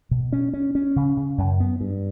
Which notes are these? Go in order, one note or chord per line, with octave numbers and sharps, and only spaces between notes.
B2
C#4
C#4
C#4
C#3
C#3
F#2
B3
G2